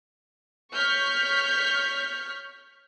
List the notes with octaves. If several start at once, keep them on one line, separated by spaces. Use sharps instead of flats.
C#5 C#6 F6 G6 B6